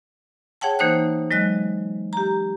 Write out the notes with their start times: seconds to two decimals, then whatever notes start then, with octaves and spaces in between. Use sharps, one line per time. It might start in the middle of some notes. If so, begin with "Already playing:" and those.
0.61 G#4 C#5 F#5 G5 A5
0.79 E3 A#3 D#4 C5 F#6
1.31 F#3 G#3 D#5 F#6
2.13 G4 A#5